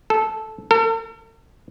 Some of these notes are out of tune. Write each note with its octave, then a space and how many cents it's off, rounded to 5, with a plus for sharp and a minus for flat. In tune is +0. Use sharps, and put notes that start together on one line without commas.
A4 -10
A4 +45